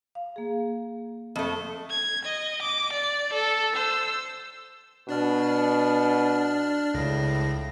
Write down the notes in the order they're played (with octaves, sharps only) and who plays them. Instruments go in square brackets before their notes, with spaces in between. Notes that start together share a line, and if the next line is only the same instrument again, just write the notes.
[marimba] F5
A#3 G#4
[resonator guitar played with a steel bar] F2 A3 [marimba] E5
[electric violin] G#6
D#5
D6
D5
A4
C5 E6
[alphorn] B2 [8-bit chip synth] D4 D5 F6
[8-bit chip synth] C#2 C#3 A#6 [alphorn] A2